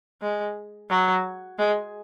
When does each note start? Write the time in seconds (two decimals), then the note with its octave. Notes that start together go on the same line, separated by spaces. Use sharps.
0.22 G#3
0.90 F#3
1.58 G#3